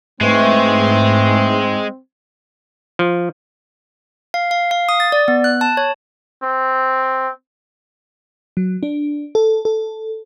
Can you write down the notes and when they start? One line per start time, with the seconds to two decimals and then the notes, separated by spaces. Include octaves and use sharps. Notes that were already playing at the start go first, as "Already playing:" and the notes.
0.21 G#2 E3 G#3 A3 C4
2.99 F3
4.34 F5
4.51 F5
4.71 F5
4.89 D#6
5.00 A6
5.12 D5
5.28 B3
5.44 F#6
5.61 A5
5.77 C#5
6.43 C4
8.57 F#3
8.83 D4
9.35 A4
9.65 A4